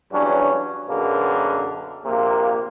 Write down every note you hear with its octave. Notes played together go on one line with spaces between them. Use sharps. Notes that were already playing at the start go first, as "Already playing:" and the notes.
E2 G2 F#3 C#4 D4
F#2 B2 D3 A#3 G#4
A#1 C3 A#3